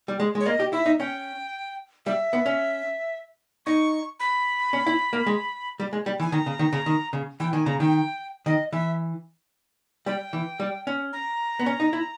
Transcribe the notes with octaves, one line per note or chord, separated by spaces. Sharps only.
G3
G#3
G#3
C#5
A#3 D#5
G4
E4 E5
D#4
C#4 G5
G3 E5
B3
C#4
D#4 C#6
B5
C#4
E4
A#3
G#3
G3
G#3
G3
E3 G#5
D#3 A#5
C#3
D#3
C#3
D#3
C#3
E3 G5
D#3 G#5
C#3 A#5
D#3 G5
D#3 D#5
E3 E5
G3 G5
E3
G3
C#4
A#5
B3
C#4
D#4
E4